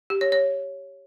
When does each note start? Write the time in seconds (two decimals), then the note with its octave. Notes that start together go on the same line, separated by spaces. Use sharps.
0.10 G4
0.21 C#5
0.32 C#5